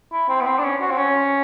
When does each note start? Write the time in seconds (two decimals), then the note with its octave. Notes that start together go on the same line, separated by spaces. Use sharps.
0.12 E4
0.29 C4
0.41 B3
0.46 C4
0.59 D4
0.64 C#4
0.81 F#4
0.91 C4
0.98 C#4